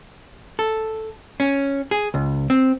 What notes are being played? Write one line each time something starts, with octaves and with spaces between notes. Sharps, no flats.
A4
C#4
G#4
C#2
C4